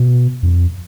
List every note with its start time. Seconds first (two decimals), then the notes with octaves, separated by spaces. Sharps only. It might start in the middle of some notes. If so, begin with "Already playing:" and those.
Already playing: B2
0.43 F2